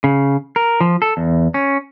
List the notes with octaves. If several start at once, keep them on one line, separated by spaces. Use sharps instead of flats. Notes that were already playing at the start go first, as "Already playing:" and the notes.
C#3
A#4
F3
A4
E2
C#4